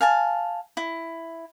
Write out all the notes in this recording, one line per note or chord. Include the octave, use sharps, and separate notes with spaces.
F5 G#5 A5
E4